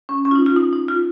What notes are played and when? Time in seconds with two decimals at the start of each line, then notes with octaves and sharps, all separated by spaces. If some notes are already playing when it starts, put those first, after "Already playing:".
0.09 C#4
0.25 C#4
0.31 F4
0.36 D#4
0.46 F4
0.56 D#4
0.73 D#4
0.88 F4